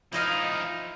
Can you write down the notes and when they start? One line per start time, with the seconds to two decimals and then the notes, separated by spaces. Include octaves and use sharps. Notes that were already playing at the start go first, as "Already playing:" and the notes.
0.12 F3 D#4 E4 D#5 F5